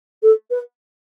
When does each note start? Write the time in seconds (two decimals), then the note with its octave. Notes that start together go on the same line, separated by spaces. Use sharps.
0.22 A4
0.50 B4